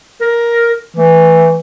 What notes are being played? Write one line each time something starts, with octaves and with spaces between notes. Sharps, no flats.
A#4
E3 A3